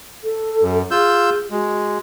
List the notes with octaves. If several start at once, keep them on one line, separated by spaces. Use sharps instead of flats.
A4
F#2
F4 G#4 E6 G6
G#3 F#4